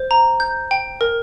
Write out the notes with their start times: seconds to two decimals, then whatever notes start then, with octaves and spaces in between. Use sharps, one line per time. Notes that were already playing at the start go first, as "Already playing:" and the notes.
Already playing: C5
0.11 A#5
0.40 G6
0.71 G5
1.01 A#4